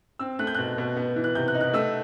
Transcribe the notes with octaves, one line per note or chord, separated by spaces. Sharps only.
C4 E6
A3 F#6
G6
B2 F#6
B2
B3
E3
F#6
C3 G6
F#6
D#4
F#6
A3 E6